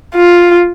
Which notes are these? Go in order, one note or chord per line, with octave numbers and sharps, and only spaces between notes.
F4